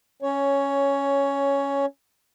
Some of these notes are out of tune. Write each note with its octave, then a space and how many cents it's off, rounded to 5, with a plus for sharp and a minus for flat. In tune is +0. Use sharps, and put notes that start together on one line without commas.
C#4 +0 C#5 +10